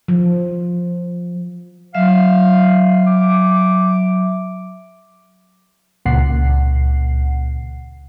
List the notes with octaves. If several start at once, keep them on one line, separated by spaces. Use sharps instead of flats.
F3
F#3 E5 F5
D6
C#2 A#2 F#5 C7